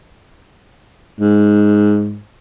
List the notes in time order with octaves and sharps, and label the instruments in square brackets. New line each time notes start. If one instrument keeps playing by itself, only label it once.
[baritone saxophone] G#2